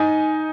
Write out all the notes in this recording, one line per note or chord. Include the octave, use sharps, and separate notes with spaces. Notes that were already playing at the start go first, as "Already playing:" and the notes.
Already playing: D#4 G#5